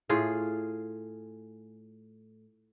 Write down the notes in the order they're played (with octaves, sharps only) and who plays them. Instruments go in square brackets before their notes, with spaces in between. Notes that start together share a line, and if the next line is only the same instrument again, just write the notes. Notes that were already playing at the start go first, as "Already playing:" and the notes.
[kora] A2 F4 G#4 F5